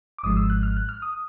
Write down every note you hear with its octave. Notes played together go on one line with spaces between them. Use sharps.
D6
G#1 G#2 F3 G#3 D#6
E6
F#6
F6
F#6
F6
D#6